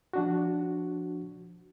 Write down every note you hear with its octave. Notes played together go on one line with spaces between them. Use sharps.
F3 D4 F#4